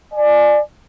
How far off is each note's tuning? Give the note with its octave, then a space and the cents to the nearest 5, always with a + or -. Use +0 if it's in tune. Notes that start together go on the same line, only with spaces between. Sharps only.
D5 +20 G#5 +25